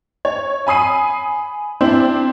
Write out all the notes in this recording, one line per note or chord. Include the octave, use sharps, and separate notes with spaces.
C#5
G#5 B5 D#6 C7 D#7
C4 D4 E4 C5